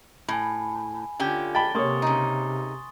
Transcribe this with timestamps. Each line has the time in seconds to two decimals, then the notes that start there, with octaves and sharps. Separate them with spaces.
0.28 A2 G#5 B5
1.20 D3 C#4 F4 G4
1.55 G5 A5 B5 A6 G7
1.75 C3 A#3 C#5 C6 C#6 D#6
2.02 C#3 D#4